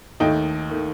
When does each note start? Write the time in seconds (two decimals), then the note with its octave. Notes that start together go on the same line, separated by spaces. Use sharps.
0.20 D#2 D#3 A3 D#5 G5
0.70 D#3 A3